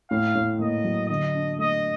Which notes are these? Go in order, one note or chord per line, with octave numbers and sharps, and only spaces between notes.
A2 F5
A2
A#3 D#5
F#3
D3 D#5
D4
A3 D#5